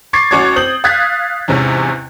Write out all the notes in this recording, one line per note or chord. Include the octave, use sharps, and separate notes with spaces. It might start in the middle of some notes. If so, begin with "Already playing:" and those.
C#6 D6 G#6 A6 C7
A1 C#4 F#4 C#5 D6 G#6
C4 D#6 G6 F#7
F5 D#6 F#6 G#6 A6 B6
E2 G#2 C3 C#4